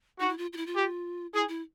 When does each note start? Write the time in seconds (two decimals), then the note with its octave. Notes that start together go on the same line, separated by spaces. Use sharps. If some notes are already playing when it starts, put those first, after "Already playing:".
0.20 D#4 F#4
0.29 E4
0.38 F4
0.53 F4
0.57 E4
0.67 F4
0.77 G4
1.33 E4 G#4
1.48 E4